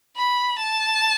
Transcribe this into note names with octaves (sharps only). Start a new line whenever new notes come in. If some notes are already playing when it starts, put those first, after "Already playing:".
B5
A5